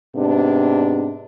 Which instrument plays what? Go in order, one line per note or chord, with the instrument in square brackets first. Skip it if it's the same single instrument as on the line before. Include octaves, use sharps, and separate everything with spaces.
[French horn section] G#2 C3 B3 D4